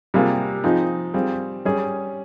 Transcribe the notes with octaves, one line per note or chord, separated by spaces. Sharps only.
C3 G3 A#3 F4 G#4
F3 C4 D#4 G#4
G3 C4 F4 G#4
G3 C#4 G#4